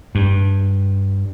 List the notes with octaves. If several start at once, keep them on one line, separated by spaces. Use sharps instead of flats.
G2